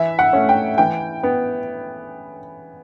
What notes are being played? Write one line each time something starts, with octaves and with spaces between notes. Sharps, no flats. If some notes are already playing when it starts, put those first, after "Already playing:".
Already playing: E3 E5
F#5
A3 C#4
G5
E3 G5
B3